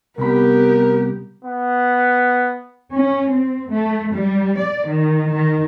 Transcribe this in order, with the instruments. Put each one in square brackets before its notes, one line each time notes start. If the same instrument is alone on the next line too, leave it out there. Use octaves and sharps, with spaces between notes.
[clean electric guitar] C2 B5 [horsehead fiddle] B3 G4 [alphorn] A#4
[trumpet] B3
[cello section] C#4
C4
A3
G3
D5
D#3
D#3